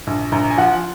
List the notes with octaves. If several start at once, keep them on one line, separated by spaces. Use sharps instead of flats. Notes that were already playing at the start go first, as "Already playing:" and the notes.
A#1
A#1 A#5
G#5
F3 F#5